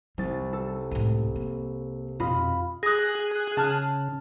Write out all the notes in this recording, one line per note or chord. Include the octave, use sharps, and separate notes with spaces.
C2 G3 A6
A4
C#2 A2 D#7
A#3
F2 B2 F4 D#5 B5
G#4 D#6 F#6 A#6
C#3 A5 F6